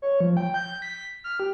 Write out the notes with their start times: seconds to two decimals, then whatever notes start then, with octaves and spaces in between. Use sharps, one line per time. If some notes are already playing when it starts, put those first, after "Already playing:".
0.02 C#5
0.20 F3
0.37 G5
0.54 G6
0.82 B6
1.24 F6
1.40 G4